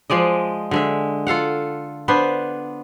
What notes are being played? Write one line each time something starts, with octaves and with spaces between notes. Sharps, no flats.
F3 G#3 D5 D#5
D3 G#3 E5
F4 A4 F5 F#5
B3 D4 B4 C5